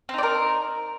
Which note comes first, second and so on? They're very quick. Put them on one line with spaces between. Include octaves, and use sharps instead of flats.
C4 D#4 D5 A#4